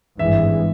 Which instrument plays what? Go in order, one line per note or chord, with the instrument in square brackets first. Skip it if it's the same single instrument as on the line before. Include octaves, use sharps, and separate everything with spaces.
[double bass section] G#1 G2 E3 G#3 [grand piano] E5